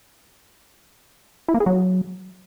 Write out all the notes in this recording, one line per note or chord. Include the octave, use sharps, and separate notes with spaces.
E4
A#3
G#4
F#3